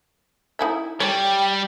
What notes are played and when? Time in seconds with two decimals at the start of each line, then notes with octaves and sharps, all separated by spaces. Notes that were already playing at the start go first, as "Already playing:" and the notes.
0.59 D#4 E4 E5
1.00 G3 C#5 G5